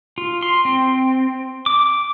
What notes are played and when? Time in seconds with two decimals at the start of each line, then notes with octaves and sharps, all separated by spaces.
0.18 F4
0.43 C6
0.65 C4
1.66 D6